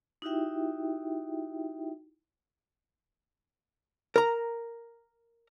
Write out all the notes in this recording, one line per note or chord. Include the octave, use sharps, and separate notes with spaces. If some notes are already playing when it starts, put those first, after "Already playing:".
D#4 E4 F#4 G4 E5 G5
A#4 A#5